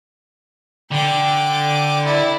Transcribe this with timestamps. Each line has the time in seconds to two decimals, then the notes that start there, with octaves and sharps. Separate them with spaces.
0.91 D3 G5 D6
2.04 E4 D5